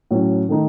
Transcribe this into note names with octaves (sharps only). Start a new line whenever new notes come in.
A2 F#3 C#4
D#3 A3 D#4